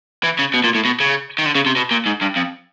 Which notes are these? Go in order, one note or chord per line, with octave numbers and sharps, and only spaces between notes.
E3
C#3
B2
A#2
A2
B2
C#3
D#3
D3
C#3
C3
B2
A#2
G#2
G2
F2